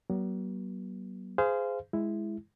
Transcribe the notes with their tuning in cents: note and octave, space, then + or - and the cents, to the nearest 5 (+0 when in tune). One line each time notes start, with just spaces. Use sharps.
F#3 +40 B3 -45
G#4 +0 C5 -25 F5 -15
G#3 +0 E4 +5